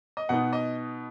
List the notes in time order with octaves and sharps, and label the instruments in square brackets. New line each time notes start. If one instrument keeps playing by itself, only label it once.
[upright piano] D#5
B2 B3 D#4 F#5
D#5